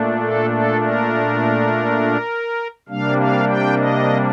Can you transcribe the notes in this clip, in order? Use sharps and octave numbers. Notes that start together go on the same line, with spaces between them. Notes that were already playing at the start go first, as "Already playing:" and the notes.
Already playing: A#2 A3 D4
A4
A4
A#4
C3 G3 A#3 D4 F5
F5
G5
D#5